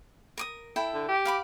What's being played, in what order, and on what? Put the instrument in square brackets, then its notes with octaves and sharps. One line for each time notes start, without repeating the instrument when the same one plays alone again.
[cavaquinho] A#4 D6 D#6
E4 A4 G5
[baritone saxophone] D3
G4
[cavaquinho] F5 B5 D6